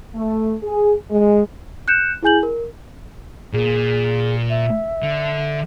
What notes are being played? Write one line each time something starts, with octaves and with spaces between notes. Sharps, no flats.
A3
G#4
G#3
F#6 G6 C#7 E7
E4 G#4 G#5 G6 F#7
A#4
A#2 G#4
E5
D3